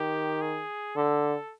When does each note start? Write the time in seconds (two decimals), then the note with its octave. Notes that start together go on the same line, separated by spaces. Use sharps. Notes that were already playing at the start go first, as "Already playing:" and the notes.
Already playing: D#3 G4
0.41 G#4
0.96 D3 A4